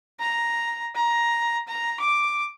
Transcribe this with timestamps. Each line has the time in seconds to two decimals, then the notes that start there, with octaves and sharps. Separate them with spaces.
0.20 A#5
0.95 A#5
1.68 A#5
2.00 D6